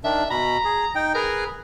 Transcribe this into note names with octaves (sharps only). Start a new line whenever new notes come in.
D#3 D4 E5
B2 A#5 B5
G#4
D#4 G5
G#4 A#4 B4